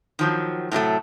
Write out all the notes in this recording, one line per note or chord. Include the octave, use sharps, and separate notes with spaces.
D#3 F3 F#3
A2 C3 F#3 A3